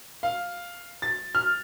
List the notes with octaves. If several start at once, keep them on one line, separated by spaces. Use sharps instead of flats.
F5
A6
F6